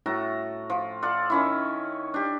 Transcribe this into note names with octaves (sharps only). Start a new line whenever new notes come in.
A2 F#4 A4 A#5
F3
F4 A4 D5 F#5
D#3 C#4 E4
D4 G4